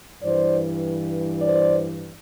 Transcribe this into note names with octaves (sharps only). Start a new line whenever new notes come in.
G2 E3 C5 D5
C5 D5